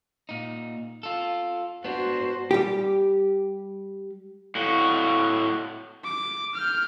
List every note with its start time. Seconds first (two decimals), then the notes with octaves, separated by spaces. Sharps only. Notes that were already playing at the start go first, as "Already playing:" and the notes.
0.29 A#2 D#4
1.03 F4 A4
1.84 B3 D4 F#4 C5
2.51 G3 G4
4.55 A2 F#4
6.04 D6
6.55 F6 G6